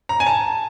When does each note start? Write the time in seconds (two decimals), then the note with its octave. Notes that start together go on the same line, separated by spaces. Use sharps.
0.09 A#5
0.20 G#5
0.26 A5